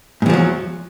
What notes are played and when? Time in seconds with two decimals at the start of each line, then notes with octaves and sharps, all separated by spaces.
0.22 G#2
0.26 E2
0.30 F3
0.33 F#3